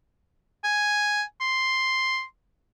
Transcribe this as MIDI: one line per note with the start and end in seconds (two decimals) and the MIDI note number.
0.64 1.23 80
1.41 2.24 84